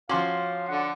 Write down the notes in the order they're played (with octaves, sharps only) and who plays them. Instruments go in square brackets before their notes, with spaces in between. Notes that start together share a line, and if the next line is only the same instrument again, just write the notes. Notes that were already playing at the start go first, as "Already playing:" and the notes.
[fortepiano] F3 C6 D6 [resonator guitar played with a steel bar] C#4 F#4 [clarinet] F5
[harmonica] D3 [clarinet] F#5